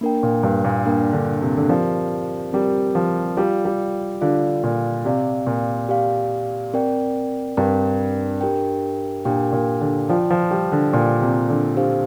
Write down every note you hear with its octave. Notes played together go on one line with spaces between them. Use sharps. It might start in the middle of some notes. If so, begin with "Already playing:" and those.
A#3 D4 A#4 G5
A#2
G2
A#2
A#3 D4 A#4 G5
D3
C3
D3
F3 C4 G4 A#4 D5
G3 C4 G4 A#4 D5
F3
G3 F4 D5 F5
G3
D3 F4 D5 F5
A#2
C3 G4 D5 F5
A#2
G4 D5 F5
C4 A#4 D5 G5
G2 C4 A#4 D5 G5
D4 G4 A#4 G5
A#2 D4 G4 A#4 G5
A#2
D3
F3 F4 D5 G5
F3
G3
D3
A#2 F4 D5 G5
C3
D3
D4 G4 C5 F5